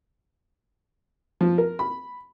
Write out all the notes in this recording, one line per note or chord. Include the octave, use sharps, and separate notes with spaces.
F3
A#4
B5